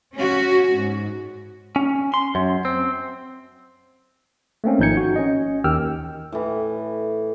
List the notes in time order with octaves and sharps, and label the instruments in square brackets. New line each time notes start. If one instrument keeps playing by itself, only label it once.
[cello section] C#4 F#4
G#2
[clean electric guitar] C#4
C6
F#2
C4
[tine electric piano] A3 A#3 C4 C#4
G#1 F3 D#4 G6 G#6 C#7
F#4
C#4 D#5
D#2 D#3 G4 G5 E6 F6
[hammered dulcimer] A2 E3